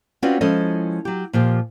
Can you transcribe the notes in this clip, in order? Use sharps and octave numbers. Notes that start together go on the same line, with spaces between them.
C4 C#4 F4 F#4 B4 D5
F3 G#3 C#4 E4 A4 D#5
F#3 G4
A#2 F3 G4